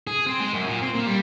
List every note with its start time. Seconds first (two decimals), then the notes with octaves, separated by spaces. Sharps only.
0.07 G#4
0.26 C4
0.40 G#3
0.53 F#2
0.68 A#2
0.82 C4
0.94 A#2
1.07 G3